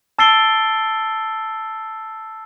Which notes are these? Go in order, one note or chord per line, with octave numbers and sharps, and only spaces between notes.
A5 E6 A6 C7 D7 G7